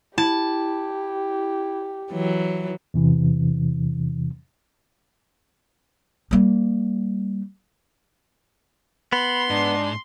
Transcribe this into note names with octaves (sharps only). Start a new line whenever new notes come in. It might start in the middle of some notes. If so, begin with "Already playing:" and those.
E4 G4 A5
E3 F#3
E2 C3 E3
G3 A#3
B3 B5 C6
G#2 D4